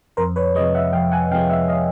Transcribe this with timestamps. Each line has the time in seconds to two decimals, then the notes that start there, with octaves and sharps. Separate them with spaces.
0.17 F2 A#4 C5
0.36 B4 C#5
0.55 C3 F3 G#3 C#5 D#5
0.75 E5 F#5
0.93 F2 F5 G5
1.12 F#5 G#5
1.31 C3 F3 G#3 F5 G5
1.50 E5 F#5
1.68 D#5 F5